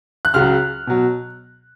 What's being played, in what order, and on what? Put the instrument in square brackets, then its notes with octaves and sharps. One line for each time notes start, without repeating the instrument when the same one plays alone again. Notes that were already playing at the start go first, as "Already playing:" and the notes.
[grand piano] F#6
C#2 C#3 F#3 F6
B2 F#3